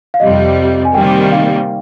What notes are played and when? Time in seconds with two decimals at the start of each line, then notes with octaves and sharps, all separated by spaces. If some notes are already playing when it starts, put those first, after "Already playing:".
0.14 F5
0.20 F2 C3 G3 D#5
0.85 G#5
0.94 C3 D#3 G3 A#3 G5
1.32 F5